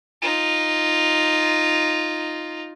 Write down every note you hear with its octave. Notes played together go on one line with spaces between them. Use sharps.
D#4 F4